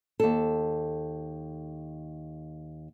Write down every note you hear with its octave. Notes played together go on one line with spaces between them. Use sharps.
D#2 A4